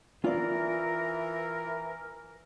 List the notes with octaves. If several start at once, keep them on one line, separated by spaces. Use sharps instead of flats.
E3 F4 A#4 D5